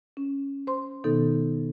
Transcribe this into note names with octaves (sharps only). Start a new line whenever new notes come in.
C#4
C5 C6
B2 D#3 B3 D#4 A4